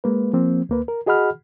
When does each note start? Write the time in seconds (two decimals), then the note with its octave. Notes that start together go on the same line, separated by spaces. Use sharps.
0.04 G#3 A#3 B4
0.33 F3 A#3 C4
0.69 D2 A#3 B4
0.88 A#4
1.06 F#4 G#4 D#5 F#5 B5 F6